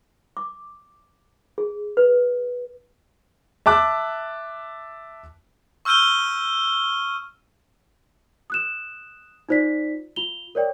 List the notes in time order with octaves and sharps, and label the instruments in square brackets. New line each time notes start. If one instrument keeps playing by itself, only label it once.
[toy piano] D6
G#4
B4
[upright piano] E5 A5 D6 F#6
[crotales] C#6 E6 F6 G6 D#7 G7
[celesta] D#6 F#6 E7
D#4 F4 C5 D5 B6
F4 F7 G7
A#4 C#5 D5 G5